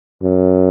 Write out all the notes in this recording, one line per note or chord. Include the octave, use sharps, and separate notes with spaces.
F#2